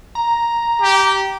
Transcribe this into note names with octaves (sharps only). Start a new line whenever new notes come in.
A#5
G4